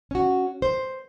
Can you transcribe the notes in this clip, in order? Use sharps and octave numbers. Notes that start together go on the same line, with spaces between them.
C#4 F#4
C5